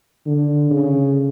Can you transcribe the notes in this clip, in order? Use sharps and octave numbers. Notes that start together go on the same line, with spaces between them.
D3
C#3